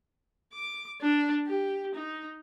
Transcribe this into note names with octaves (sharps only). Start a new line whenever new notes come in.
D6
D4
G4
D#4